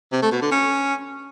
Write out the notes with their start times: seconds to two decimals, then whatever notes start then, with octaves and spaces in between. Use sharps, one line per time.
0.12 C3
0.22 A3
0.32 B2
0.42 D3
0.51 C#4